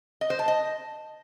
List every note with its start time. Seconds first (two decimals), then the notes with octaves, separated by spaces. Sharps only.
0.21 D#5
0.30 C5
0.39 A5
0.48 D#5